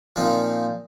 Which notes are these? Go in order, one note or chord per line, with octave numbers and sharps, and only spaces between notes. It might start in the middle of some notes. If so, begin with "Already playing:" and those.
A#2 F3 C4 D#4